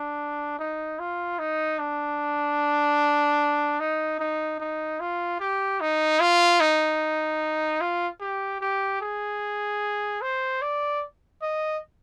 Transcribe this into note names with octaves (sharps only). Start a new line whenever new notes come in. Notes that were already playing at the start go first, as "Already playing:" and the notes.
Already playing: D4
D#4
F4
D#4
D4
D#4
D#4
D#4
F4
G4
D#4
F4
D#4
F4
G4
G4
G#4
C5
D5
D#5